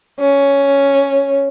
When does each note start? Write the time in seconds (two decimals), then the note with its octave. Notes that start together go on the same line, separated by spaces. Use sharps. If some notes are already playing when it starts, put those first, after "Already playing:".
0.20 C#4